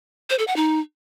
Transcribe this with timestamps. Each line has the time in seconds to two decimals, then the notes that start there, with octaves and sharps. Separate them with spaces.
0.30 C5
0.39 A4
0.47 F#5
0.56 D#4